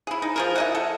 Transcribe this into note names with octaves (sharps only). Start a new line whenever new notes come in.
E4 G#4
D#4
F3 G#4 A#4
E4 D#5 F#5
A4